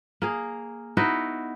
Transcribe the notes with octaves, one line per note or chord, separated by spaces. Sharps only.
A#3 G#4
B3 D#4 E4 F#4